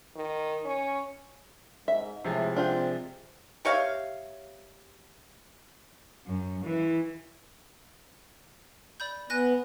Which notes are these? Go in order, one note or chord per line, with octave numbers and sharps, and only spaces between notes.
D#3
C#4
G#2 E5
A2 C3 F3 G#3
C4 D4 F4 G4
G4 C#5 E5 F5
F#2
E3
D5 B5 G6
B3 G#5 F#6 A#6